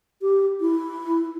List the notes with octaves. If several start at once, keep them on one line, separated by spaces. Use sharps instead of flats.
G4
E4